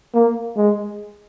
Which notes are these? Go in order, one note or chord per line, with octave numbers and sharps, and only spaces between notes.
A#3
G#3